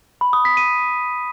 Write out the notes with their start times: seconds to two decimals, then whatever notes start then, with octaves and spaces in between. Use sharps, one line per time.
0.21 B5
0.33 D#6
0.45 B6
0.57 D#7